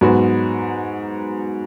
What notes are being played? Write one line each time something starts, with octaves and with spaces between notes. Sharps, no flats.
G#2 F#3 B3 F#4